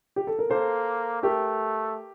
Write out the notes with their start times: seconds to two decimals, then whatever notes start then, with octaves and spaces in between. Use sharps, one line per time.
0.16 G4
0.27 A4
0.39 A#4
0.50 A#3 A4 C5
1.23 A3 G4 A#4